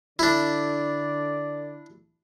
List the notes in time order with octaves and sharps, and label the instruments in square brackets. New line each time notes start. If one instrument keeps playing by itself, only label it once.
[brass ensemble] D3 D5 [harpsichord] D4 E4